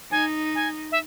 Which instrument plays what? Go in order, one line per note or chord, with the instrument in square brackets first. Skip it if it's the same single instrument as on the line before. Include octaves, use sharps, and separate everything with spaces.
[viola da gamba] D#4 [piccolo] G#5
[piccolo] G#5
E5